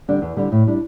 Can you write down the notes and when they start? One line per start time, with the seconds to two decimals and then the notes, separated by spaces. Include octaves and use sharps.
0.08 D3 G3 D4
0.22 E2
0.37 D3 G3 D4
0.52 A2
0.67 G3 D4